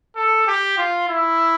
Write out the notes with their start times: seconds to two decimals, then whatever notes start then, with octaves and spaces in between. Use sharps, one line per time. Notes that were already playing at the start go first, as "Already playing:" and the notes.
0.16 A4
0.47 G4
0.78 F4
1.09 E4